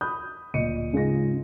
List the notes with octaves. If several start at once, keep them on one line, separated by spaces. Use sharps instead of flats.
B5 D#6 F#6 G6
D1 A#2 D#5 C#7 D#7
G#2 C#3 F4 G#4 D#5 A#6